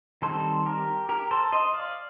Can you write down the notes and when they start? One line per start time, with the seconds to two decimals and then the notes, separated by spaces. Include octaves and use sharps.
0.22 D#3 G3 C4 A4 C5
0.66 G4 A#4
1.09 G4 A#4
1.31 A4 C5
1.52 C5 D#5
1.74 D5 F5